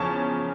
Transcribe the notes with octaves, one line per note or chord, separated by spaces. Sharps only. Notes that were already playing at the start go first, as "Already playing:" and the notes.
Already playing: E2 C#3 F3 C#4 A5 C#6